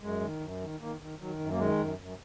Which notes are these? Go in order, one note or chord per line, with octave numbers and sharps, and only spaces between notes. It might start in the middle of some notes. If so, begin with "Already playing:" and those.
F#2 G#3
D#3
F#2
D#3
D#3 A#3
D#3
D#3 F#3
F#2
A#3
D#3 G#3
F#2
F#2